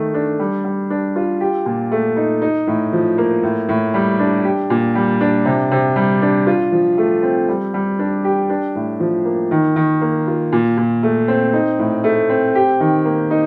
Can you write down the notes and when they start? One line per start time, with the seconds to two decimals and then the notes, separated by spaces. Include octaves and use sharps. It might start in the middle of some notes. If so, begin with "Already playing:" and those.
Already playing: D#3 A3
0.14 D4
0.39 G3
0.65 G3
0.90 D4
1.16 F4
1.41 G4
1.66 A#2
1.91 A3
2.17 D#4
2.42 D#4
2.67 A2
2.93 F3
3.18 A#3
3.43 A2
3.69 A2
3.94 G3
4.19 D4
4.44 G4
4.70 A#2
4.95 G3
5.21 D4
5.46 C3
5.71 C3
5.96 G3
6.22 D4
6.47 F4
6.72 F3
6.98 A3
7.23 C4
7.49 G3
7.74 G3
7.99 D4
8.24 G4
8.50 D4
8.75 A2
9.00 F3
9.25 A#3
9.51 D#3
9.76 D#3
10.01 A#3
10.27 F4
10.53 A#2
10.77 A#2
11.03 A3
11.28 C4
11.53 D#4
11.79 A2
12.04 A3
12.30 C4
12.55 G4
12.80 D#3
13.05 A#3
13.31 D#4